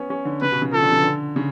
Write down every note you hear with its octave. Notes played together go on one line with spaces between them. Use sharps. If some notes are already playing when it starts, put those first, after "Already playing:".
Already playing: B3 C#4
C#4
D3
C#3 B4
B2
C#3
F3 A4
D3
C#3
D3
C#3